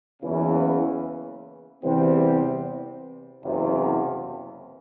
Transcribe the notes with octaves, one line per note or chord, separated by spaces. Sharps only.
F#1 E2 C#3 E3
E2 C3 E3 G3 C4
F#1 E2 C3